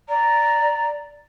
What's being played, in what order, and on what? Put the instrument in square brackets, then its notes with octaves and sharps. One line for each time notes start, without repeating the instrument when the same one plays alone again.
[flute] D5 [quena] A#5